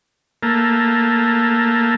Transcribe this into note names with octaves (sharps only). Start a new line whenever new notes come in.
A3 A#3